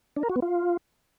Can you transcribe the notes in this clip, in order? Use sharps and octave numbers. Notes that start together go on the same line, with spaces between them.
D4
A#4
F#4
B3
F4